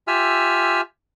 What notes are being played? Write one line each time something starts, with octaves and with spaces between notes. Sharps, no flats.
F4 G4 E5 G#5 E6 F6